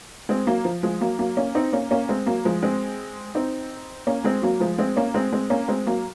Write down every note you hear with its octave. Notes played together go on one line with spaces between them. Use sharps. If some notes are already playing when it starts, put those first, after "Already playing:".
G#3 C4
F#3 A#3
F3
F3 G#3
F#3 A#3
F#3 A#3
A#3 C#4
C4 D#4
A#3 C#4
A#3 C#4
G#3 C4
F#3 A#3
F3 G#3
G#3 C4
C4 D#4
A#3 C#4
G#3 C4
F#3 A#3
F3 G#3
G#3 C4
A#3 C#4
G#3 C4
G#3 C4
A#3 C#4
G#3 C4
F#3 A#3